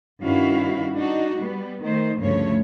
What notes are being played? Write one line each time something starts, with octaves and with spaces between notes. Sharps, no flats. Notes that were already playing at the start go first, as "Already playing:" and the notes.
G2 D#3 C#4 E4 F#4 F5
D4 D#4 F#4
G3 B3
D#3 A3 C5
D2 G2 C#3 F3 A3 C#5